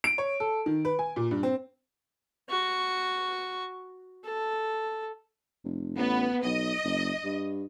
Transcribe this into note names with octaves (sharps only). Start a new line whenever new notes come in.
D7
C#5
A4
D#3
B4
G#5
A#2
G2
C4
F#4 C#6
A4
F1
A1 B3
B1 D#5
F#1
G2